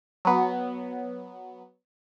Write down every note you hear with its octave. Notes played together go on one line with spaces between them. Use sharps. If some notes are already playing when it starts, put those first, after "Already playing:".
F#3 B3